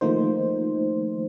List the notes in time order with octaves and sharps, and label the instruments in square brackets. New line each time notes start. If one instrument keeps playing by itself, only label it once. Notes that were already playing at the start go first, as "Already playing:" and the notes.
[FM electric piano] D#3 F3 A3 A#3 D#4 C5